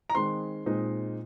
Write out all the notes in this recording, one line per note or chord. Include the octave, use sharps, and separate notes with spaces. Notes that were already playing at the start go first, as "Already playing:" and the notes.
A#5
D#3 G#3 C4 D#4 C6
A#2 G#3 C4 D#4